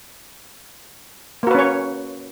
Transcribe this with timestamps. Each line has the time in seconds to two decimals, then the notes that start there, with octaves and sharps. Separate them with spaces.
1.43 A#3
1.47 F#4
1.51 B4
1.55 C#4
1.59 C#5